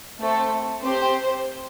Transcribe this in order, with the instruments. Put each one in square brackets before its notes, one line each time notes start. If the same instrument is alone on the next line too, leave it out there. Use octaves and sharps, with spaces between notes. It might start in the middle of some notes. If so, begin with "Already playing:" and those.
[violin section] A3 C4 A4
C4 G4 C5